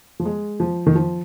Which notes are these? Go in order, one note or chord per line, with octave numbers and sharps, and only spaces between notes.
F3
G#3
F3
D#3
F3